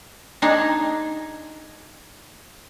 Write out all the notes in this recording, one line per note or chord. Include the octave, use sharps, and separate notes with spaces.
D4 D#4 G#4